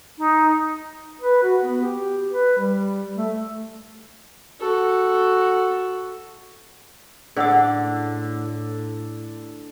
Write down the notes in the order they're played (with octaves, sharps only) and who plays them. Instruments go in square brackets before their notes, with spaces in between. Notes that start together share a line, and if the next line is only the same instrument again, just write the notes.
[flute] D#4
[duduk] B4
F#4
B3
G4
B4
G3
A3
[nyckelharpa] F#4 A4
[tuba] A2 [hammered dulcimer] D3 [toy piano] G#4 F#5 E6